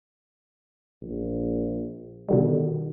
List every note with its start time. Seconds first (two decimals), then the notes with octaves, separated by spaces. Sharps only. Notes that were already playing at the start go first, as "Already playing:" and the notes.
1.02 A#1
2.29 B2 D3 D#3 G3